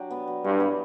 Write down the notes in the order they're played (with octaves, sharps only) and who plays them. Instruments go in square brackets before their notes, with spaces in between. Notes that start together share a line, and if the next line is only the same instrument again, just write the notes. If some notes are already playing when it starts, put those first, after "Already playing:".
Already playing: [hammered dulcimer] F#3 D4 G4
B3
F#3
[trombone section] G2 [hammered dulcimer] E3
[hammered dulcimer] B3